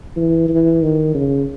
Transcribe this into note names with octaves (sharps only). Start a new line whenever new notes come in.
E3
E3
D#3
C#3